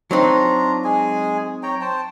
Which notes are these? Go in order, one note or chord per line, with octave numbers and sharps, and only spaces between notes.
F#3 C4 D4 D#4 F4 A#5
G#3 G#4 G#5
C#5 G5 A#5
C5 G5 A5